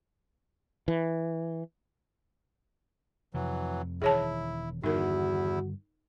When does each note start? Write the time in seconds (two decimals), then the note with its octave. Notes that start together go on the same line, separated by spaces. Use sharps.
0.88 E3
3.34 F2 C3 E3 F#3
4.02 E1 D#3 E4 G#4 C#5 A5
4.84 E2 G2 D3 D#3 D#4 E4 F#4 A#4